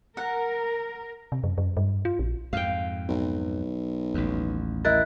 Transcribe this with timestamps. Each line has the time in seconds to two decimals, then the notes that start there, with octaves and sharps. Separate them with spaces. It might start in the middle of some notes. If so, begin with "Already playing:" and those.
0.17 A#4 F#5
1.32 C3
1.44 F#2
1.58 F#2
1.77 G2
2.05 F4
2.19 A#1
2.53 F2 G#2 F5 G5
3.09 B1
4.14 A1 D#2
4.85 E4 A#4 D#5 F#6 A6